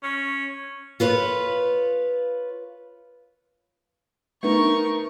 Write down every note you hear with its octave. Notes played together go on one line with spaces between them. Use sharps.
C#4
F4 B4 C#5
A3 B3 D#4 A#4 C#6